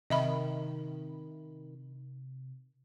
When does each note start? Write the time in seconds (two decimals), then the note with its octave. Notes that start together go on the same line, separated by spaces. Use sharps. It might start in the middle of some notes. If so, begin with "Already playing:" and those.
0.10 C3 D#3 D#5 E5 B5